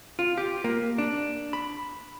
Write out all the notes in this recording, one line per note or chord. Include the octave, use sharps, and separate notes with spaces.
F4
G4
A#3
D4
B5